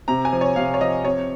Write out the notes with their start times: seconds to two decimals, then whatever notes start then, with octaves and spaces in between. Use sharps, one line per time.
0.08 C3 A#5
0.25 G#5
0.33 F3
0.41 C#5
0.56 C3 F5
0.74 C#5
0.81 F3 D#5
1.04 C3 C#5